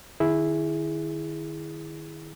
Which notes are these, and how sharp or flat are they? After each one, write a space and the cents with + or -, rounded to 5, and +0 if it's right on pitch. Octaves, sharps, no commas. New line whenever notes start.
D#3 -35 E4 +0 G#4 +0